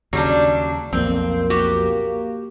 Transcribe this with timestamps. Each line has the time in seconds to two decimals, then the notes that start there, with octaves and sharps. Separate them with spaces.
0.13 D#2 C#3 F#3 G3 D4
0.93 B1 F2 A#2 A#3 C4
1.50 F#4 G4